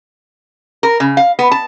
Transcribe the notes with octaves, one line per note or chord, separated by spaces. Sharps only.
A#4
C#3
F5
B3
A5